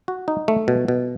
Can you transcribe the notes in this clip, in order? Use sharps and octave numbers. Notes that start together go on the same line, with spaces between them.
F#4
D#4
A3
B2
B2